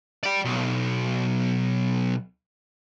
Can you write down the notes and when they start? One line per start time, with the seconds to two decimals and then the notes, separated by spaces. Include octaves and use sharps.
0.23 D5 G5
0.45 B1